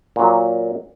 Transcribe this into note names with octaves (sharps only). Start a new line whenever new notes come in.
A#2 F#3